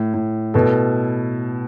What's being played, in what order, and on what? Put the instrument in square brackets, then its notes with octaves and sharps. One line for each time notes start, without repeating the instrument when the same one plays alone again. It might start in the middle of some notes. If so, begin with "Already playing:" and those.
Already playing: [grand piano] A2
A2
B2 A4